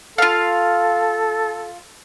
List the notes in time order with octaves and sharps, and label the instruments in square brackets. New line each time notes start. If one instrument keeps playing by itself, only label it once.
[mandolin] F4 F5 [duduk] A4